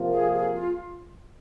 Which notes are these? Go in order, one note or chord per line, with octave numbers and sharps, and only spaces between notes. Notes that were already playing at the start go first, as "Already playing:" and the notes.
Already playing: C3 F3 A#3 F4 A#4
G#4
G#4
F4